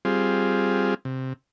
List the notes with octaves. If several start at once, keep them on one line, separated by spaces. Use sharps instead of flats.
G3 C4 F4 G#4
C3